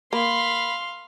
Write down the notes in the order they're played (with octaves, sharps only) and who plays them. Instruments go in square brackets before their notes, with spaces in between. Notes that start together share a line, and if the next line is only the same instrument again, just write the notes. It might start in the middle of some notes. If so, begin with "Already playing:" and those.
[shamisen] A#3 [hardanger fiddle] F5 [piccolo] B5 [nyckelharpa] C6